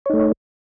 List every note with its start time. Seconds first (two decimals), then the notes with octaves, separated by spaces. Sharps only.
0.06 C#5
0.10 D#4
0.13 A3